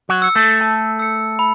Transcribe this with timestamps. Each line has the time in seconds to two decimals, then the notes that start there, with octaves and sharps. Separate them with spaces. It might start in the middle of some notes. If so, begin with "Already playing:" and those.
0.09 F#3 F#4
0.22 E6 C#7
0.36 A3 A4
0.61 A5
0.99 E6 C#7
1.39 B5